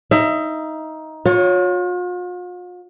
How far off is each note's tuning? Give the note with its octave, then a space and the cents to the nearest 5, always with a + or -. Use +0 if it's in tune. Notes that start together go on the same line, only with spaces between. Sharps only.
D#4 +15 E5 +30
F4 +45 C#5 +0